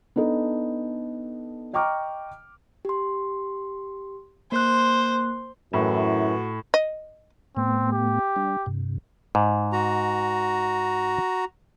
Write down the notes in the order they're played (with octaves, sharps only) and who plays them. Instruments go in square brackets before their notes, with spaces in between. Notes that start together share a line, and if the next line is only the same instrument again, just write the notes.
[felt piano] B3 D4 D#4 A4
D#5 G5 A#5 C#6 D6 F6
[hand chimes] G4 C6
[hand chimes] A#3 F#6 [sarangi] C5
[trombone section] F#2 E3 [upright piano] A2 [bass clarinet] F#4
[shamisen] D#5
[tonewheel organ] A2 A3 B3 [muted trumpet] C4
[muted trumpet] G4
[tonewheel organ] G3 D4
G2 C3
[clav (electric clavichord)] G#2
[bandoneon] F#4 A#5